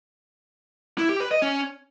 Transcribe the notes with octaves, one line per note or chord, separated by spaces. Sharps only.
E4
G4
B4
D#5
C#4